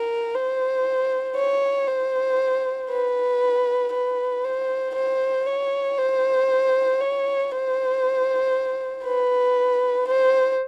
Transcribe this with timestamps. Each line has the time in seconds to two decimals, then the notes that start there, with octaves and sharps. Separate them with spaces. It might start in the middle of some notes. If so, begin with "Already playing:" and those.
Already playing: A#4
0.35 C5
1.36 C#5
1.88 C5
2.90 B4
3.93 B4
4.44 C5
4.95 C5
5.46 C#5
5.97 C5
7.01 C#5
7.51 C5
9.05 B4
10.08 C5